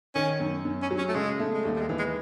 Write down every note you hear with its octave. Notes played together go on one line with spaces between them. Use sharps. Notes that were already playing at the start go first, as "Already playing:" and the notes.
D#3 C#4
F#2
F#2
C#4
F#3
C#4
A3
C#3 G#3
A3
G#3
D#2 G3
G3
G#3
E3
G#3